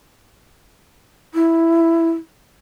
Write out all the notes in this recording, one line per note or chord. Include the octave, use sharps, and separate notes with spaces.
E4